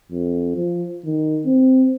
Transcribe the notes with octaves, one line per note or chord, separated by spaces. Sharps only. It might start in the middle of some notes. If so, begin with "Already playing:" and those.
F2
F3
D#3
C4